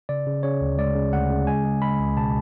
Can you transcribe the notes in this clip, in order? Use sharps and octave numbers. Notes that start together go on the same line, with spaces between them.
C#3 D5
C#3
C#3 C#5
D2
G#3 D5
C#3
D2 F#5
C#3
G#3 G#5
G#3
G#3 B5
C#2
B2 A5